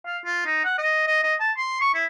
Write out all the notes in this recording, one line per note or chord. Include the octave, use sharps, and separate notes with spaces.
F5
F4
D#4
F#5
D#5
D#5
D#5
A5
C6
C#6
E4